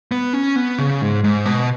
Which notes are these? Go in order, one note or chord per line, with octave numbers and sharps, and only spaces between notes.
B3
C#4
B3
C#3
G#2
G#2
B2